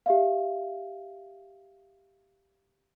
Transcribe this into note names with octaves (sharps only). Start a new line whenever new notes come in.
G4 E5 F5